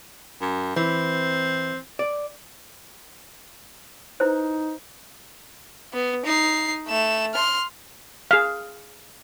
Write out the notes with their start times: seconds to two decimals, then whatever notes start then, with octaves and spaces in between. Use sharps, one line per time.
0.41 F#2
0.76 E3 C4
1.99 D5
4.20 D#4 E4 B4 C5
5.93 B3
6.26 D#4 C7
6.88 A3 E7
7.34 C6 F6
8.31 G#4 F5